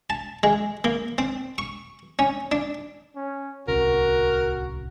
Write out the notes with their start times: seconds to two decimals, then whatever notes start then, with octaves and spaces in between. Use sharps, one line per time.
0.10 A5
0.43 G#3
0.84 A#3
1.18 C4
1.58 C#6
2.19 C#4
2.52 D4
3.15 C#4
3.68 D1 C2 C#4 F#4 A#4